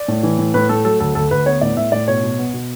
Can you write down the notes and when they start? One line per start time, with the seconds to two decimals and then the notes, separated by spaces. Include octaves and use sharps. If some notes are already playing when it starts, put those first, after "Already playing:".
Already playing: D5
0.08 A2
0.23 E3
0.39 A2
0.54 A2 B4
0.69 A3 A4
0.85 F#3 A4
1.00 D2 A4
1.15 D2 A4
1.31 D2 B4
1.46 B3 C#5
1.61 A2 D5
1.77 A2 E5
1.92 A2 D5
2.08 B2 C#5
2.23 B2
2.38 B3
2.54 B2